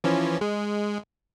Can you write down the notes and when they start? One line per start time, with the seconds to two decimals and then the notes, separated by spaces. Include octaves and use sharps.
0.04 E3 F3 C#4
0.41 G#3